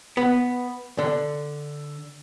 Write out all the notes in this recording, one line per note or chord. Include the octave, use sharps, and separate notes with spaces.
B3
D3